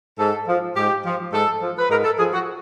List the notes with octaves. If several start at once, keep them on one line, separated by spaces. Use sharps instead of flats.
G#2 A4
F3
G#2 G4
F3
G#2 A4
F3
B4
G#2 A#4
A4
F3 G#4
F#4